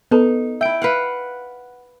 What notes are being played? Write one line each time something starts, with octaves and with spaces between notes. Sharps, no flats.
B3 D#4 A4 B4
E4 E5 G5 D7
B4 F5 F#5